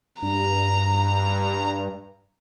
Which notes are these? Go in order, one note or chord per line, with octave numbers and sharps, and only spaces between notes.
G2 A#5